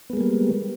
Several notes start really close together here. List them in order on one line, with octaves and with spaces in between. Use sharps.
B3 G#3 A#3 G3